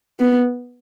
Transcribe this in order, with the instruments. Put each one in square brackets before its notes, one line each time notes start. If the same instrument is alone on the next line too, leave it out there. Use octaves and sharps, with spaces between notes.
[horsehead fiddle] B3